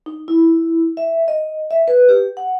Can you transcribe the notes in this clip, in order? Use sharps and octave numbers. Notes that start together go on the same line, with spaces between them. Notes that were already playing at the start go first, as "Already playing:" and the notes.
D#4
E4
E5
D#5
E5
B4
G4
F#5